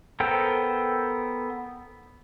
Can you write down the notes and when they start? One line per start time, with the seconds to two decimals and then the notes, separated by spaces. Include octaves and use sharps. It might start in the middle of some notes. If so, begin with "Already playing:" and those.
0.20 B3 A4 A#4 C5 G5